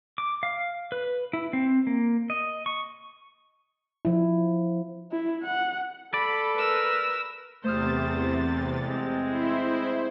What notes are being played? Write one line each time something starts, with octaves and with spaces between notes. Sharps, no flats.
D6
F5
B4
E4
C4
A#3
D#5
C#6
F3 E4
E4
F#5
A4 D5 B5
A#4 B4 E6
E2 C3 A3 C5 D#6 F6 A6
G#3 C4
E4 C5